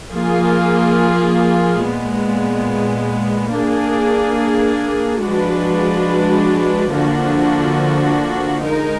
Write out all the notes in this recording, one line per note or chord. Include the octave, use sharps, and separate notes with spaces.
F3 A#3 F4 G#4
A#2 G#3 B3
A#3 D4 G#4
F3 G#3 D4 F#4 B4
D3 F3 A#3 D4 F#4
G#3 D#4 A#4